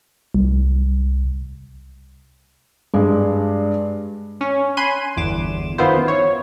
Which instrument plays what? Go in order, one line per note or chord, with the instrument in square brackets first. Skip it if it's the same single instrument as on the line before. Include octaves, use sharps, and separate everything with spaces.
[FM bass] C2
[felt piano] G2 G#3
[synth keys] C#4
G#5 B5 C6 F#6 D#7
G1 E2 D6 E7
F#2 D#3 B3 E4 F4 C5
C#5